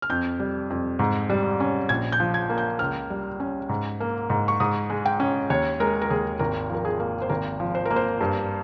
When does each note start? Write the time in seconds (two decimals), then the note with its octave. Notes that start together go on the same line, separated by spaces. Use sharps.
0.02 F6
0.10 F2 G6
0.39 G3
0.70 F2
0.99 G#2
1.30 G3
1.60 C#4
1.89 A#1 G#6
2.12 G6
2.20 F3
2.34 G#6
2.49 A#3
2.58 G6
2.79 C#2 F6
3.10 G3
3.40 C#4
3.69 G#2
4.00 A#3
4.30 G#2
4.48 C#6
4.60 G#2 D#6
4.90 G#3
5.05 G5
5.20 C#4
5.50 D#2 C#5
5.80 G#3 A#4
6.02 A#4
6.10 D#2 G#4
6.39 G#1 A#4
6.70 F3 A#4
6.85 G#4
7.00 A#3
7.22 C5
7.29 G#1 A#4
7.60 F3
7.75 C5
7.85 A#3 A#4
7.96 C5
8.21 G2